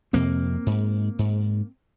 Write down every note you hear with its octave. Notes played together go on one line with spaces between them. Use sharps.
F2 C3 A#3 C4
G#2
G#2